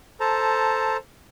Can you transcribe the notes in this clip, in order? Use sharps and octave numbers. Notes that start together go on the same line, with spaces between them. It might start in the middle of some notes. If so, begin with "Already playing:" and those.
A4 C5 A5 A#5